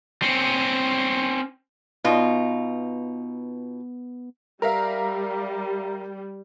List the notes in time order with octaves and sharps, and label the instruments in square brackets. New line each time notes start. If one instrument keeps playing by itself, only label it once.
[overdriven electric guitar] C4 C#4
[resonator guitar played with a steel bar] B2 D#4 F4 [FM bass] B3
[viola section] G3 [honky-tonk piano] A#4 E5 F5 [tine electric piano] A#5